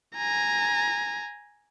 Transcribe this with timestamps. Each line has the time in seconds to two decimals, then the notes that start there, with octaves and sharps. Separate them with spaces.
0.17 G#5 A#5